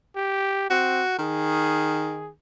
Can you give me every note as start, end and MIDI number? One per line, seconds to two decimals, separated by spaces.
0.16 0.68 67
0.70 1.04 60
0.70 1.17 66
1.19 2.33 51
1.19 2.30 68